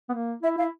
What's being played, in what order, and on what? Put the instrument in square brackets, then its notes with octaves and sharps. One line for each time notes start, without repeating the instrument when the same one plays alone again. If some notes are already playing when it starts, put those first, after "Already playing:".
[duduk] B3
A#3
[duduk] E4 [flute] E5
[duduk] E4 [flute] F5